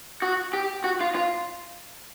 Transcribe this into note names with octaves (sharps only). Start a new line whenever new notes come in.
F#4
G4
F#4
F4
F4